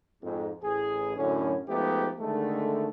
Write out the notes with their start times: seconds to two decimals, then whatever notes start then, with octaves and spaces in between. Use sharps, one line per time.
0.23 F2 G#2
0.63 A1 G#4
1.17 F#2 A2 D3 F#3 C#4
1.69 F3 G#3 A3 B3 D#4 G4
2.19 D3 D#3 G#3 A3